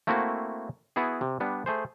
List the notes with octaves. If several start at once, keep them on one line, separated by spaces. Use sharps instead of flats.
A3 A#3 C4 E4 F#4
B3 E4 F#4 G#4
C3
G3 B3 D4
A3 G#4 C5